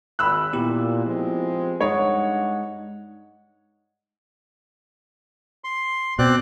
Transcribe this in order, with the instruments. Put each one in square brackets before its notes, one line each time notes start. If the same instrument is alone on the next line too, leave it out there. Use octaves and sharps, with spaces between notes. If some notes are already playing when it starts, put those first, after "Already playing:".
[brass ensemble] G#1 [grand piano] B5 E6 F#6
[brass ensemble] A#2 [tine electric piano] B3 E4 G4
[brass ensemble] F3 G#3 C4
[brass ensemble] G2 F#5 [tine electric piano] G#3 D#4 D#5 [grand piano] C#5
[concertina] C6
[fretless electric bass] B2 [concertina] C4 D5 F#6